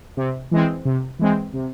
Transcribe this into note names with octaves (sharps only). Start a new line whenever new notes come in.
C3
E3 G#3 C4
C3
E3 G#3 C4
C3